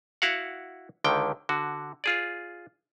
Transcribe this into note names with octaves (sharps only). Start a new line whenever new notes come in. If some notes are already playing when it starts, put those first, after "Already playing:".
E4 F#4 F5 F#5
C#2 D3 D#3 G5
D3 F#4
F4 G#4 D5